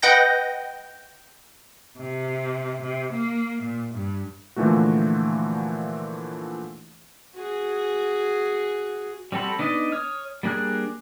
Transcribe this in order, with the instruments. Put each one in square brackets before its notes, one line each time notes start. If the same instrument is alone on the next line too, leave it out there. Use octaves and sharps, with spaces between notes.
[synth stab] B4 D#5 F#5 G5 G6 A#6
[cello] C3
C3
A#3
A#2
G2
[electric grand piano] A#2 D3 E3 F3 A3 F#4
[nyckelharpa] F#4 G#4
[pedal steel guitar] G3 C4 F#4 A4 B5
B3 D4 D#4 D5 D#5
C#5 D#6 F6
G3 A#3 D4 G#4 F#6